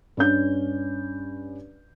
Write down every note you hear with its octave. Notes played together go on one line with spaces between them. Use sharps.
G2 C#4 G6